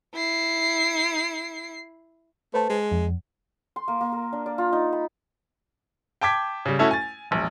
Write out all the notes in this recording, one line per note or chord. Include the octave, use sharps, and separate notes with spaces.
E4 C7
A3 B4 C5 A5
G#3
F2
C6
A#3
A#3
A#4
D4
D5
F4
D#4
B5
G5 A5 D6 G#6 B6
C#3 G3
A3 C#4 E4 F#4 A4
G#5 A6
E1 A#1